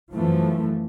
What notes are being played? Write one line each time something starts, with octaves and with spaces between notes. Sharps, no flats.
F#2 E3 F3 A3